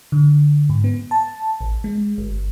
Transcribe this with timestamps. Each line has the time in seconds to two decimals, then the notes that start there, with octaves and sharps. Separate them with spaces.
0.12 D3
0.70 G#2
0.84 B3
1.11 A5
1.61 A1
1.84 G#3
2.18 G1